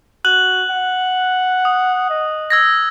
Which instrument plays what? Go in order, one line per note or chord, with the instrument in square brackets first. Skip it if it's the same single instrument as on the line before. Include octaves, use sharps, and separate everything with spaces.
[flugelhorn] F#4 [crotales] F#6 F#7
[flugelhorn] F#5
[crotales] D#6
[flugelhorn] D#5
[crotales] E6 G#6 A#6